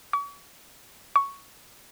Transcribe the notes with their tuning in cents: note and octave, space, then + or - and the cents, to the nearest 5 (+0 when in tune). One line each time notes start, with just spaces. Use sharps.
C#6 +40
C#6 +5